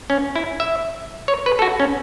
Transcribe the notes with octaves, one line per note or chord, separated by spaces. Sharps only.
C#4
E4
E5
C#5
B4
A4
F#4
C#4